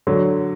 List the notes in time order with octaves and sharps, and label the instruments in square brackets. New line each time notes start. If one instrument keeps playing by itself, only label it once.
[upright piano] D3 F#3